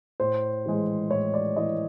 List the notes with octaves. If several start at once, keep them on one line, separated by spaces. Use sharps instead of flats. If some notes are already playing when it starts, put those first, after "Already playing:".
A2 C5
E3 G#3
A2 C#5
D5
E3 G#3 D#5